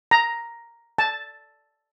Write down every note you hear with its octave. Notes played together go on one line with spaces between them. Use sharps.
A#5
A5